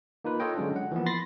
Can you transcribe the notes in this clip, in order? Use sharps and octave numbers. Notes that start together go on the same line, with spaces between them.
A#3 D#4 F4 B4
F4 A4 C#5 D#5 G5
D3 F#3 G#3 C#4 D4
F#5
E3 F3 A#3 B3
B5 C6 A6 A#6 C7